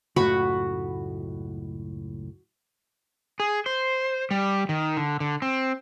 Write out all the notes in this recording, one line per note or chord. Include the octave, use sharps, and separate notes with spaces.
C#2 F#2 A2 F#4 F#5 B5
G#4
C5
G3
D#3
D3
D3
C4